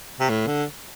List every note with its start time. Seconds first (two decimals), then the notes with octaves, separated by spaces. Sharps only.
0.20 C3
0.29 A2
0.47 D3